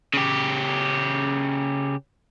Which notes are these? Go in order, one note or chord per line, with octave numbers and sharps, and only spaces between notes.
C#3 G4